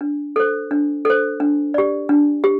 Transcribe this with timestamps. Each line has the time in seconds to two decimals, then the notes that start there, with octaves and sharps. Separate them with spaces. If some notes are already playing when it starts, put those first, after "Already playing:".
0.01 D4
0.36 A4 C5
0.71 D4
1.05 A4 C5
1.40 D4
1.74 G4 D5
2.09 D4
2.44 G4